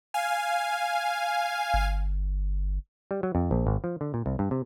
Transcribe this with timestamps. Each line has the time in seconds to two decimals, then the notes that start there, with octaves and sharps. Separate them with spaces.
0.14 F5 G#5
1.74 G1
3.11 G3
3.23 F#3
3.35 F2
3.51 A#1
3.67 G#1
3.84 F3
4.01 D3
4.14 A#2
4.26 C2
4.39 G2
4.51 C3